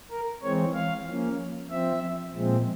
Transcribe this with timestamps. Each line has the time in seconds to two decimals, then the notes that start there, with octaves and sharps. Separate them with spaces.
0.11 A#4
0.43 E3 G#3 C4 C#5
0.74 F5
1.07 F3 A#3 C#4
1.70 F3 C4 E5
2.34 A#2 F3 G#3 C4